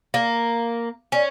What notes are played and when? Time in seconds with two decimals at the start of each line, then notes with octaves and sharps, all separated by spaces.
0.14 A#3
1.12 C#4